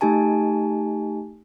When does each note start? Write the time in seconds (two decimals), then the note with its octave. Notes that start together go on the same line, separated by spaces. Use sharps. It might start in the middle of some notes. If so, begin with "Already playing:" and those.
0.01 A3 D#4 G4 G#5 A5